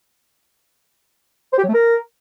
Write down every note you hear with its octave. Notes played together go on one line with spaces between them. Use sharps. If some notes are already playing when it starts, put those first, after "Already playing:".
C5
G4
F#3
A3
A#4